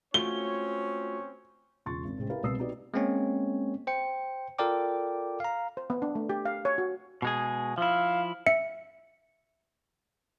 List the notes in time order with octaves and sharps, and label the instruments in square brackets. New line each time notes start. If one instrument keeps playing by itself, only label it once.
[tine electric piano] A3 F4 F#4 [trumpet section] C4 C#4 C#5 [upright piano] G7
[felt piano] E1 C#3 F4 C6 C#6 A6
G#1
A2 C3 G#3 C4 C#4
E4 G4 A#4 B4 F5
C2 B2 B4 D#6 E6 C7
B3 D#4 F#4 G4 B4 D5
[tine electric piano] G#3 A#3 C4 C#4 C#5
C5 G5 C#7
F4 A4 A#4 D5 G5 D6
F5 A#5
[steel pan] C5
B3
D4
A3
G4
F5
C#5
F#4
[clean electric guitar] B2 G#3 G#4
[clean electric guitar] F3 E4 [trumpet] F5
[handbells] E5 C#7